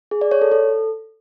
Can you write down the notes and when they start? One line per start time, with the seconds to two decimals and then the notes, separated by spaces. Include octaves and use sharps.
0.11 G#4
0.21 D5
0.31 C#5
0.42 A4
0.52 A4